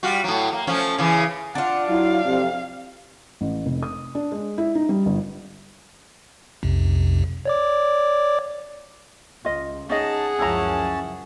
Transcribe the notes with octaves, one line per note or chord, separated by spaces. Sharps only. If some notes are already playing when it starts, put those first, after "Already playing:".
G3 F4 F#4
A2 F#3
A#3
F3 A3 C#4
C#3 E3
D4 F4 F#5
F#3 E4 F5
F2 C3
A1
F1
D#6
D4
G#3
E4
D#4
G3
G1
B1 F2 C3
C#5 D5 D6
C#2 F4 D#5
C#4 D#4 G#4 D#5 F#5 A5
C#2 F#2 F3 C#4 E4 A5 A#5